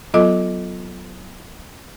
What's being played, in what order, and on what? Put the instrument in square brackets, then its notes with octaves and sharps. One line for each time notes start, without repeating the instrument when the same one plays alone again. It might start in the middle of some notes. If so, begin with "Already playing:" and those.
[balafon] F#3 B3 F4 A4 D#5 D6